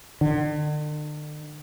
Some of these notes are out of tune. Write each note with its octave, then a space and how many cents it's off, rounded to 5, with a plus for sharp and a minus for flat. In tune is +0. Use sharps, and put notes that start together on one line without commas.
D3 +40